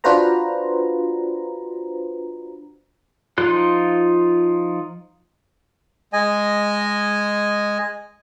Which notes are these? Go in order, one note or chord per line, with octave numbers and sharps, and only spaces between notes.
D4 F4 F#4 B4 C5 A#5
F3 D#4 F4 C6 F#6
G#3 D#5 G#5